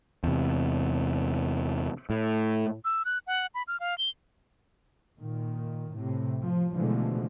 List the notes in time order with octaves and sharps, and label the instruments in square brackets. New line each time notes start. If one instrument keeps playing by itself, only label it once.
[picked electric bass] E2 C3
A2
[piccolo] E6
F#6
F#5
B5
F6
F5
G7
[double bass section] A#2 D#3
A2 C3
F3
B2 D3 E3 F3 G#3 A3